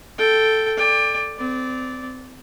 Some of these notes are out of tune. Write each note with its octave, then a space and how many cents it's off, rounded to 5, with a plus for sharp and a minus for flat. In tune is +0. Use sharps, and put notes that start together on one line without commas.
A4 +0 G5 +0
D5 +0 G5 +30
C4 -30 D5 -10